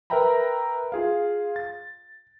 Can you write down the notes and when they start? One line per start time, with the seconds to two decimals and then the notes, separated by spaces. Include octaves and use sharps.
0.10 A#4 B4 E5 G5 A#5 B5
0.92 F4 G#4 F5
1.56 A6